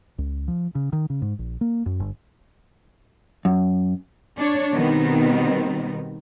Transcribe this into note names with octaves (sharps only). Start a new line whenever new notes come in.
C#2
F3
C#3
D#3
C#3
G#2
A#1
A#3
F#2
G1
F#2
D4 C#5
B2 D#3 G3 B3 C4 D#4